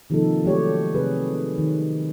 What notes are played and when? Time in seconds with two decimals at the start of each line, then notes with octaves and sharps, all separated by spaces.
0.10 C3 D#3 F3 A#3 D#4 A4
0.45 F#3 A3 G4 C#5 D5
0.94 C3 G#4 B4
1.58 D#3